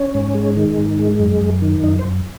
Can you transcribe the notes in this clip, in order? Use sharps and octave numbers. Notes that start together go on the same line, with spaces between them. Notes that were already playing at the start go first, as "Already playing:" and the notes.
Already playing: C#4
G#2
G#3
D#3
G#2
G#3
F#2
F#2
D#3
F#2 D#4
C5
F#2